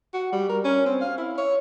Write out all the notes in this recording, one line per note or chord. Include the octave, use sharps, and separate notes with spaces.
F#4
G3
A#4
C#4
C4
F5
E4
C#5